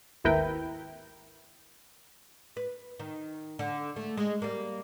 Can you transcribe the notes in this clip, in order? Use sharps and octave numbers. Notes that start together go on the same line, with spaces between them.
G#1 D#2 E4 A#4 B4 G5
B4
D#3
D3
A3
G#3
G3 A#3